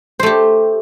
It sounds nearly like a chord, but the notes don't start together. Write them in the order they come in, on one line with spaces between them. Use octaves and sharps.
C5 A3 G4